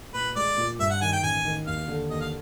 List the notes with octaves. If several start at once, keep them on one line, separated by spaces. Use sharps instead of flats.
A#2 B4
G#3 D5
A#2
G2 E5
F#5
D#3 G#5
G5
A1 G#5
D#3
D#2 F5
D3
D#2 D#5
F5